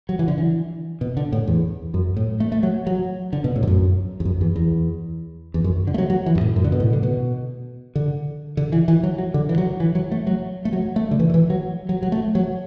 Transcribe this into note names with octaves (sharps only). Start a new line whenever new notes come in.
F#3
E3
D3
E3
B2
D3
A2
E2
F#2
A2
A3
A3
F#3
F#3
D3
B2
A2
E2
F#2
E2
F#2
E2
E2
E2
F#2
D3
A3
F#3
F#3
E3
F#2
A2
F#2
D3
B2
A2
D3
B2
D3
D3
E3
E3
F#3
F#3
D3
E3
F#3
E3
F#3
A3
F#3
A3
F#3
A3
D3
E3
D3
E3
F#3
F#3
F#3
A3
F#3